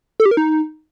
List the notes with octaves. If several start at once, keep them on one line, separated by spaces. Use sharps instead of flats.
A4
G4
A#4
D#4